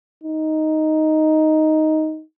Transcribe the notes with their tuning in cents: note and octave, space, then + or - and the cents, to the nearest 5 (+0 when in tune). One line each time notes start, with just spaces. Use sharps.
D#4 +5